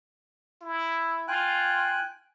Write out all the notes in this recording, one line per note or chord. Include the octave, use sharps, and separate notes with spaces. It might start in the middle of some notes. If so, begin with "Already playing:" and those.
E4
F4 G5 G#5 F#6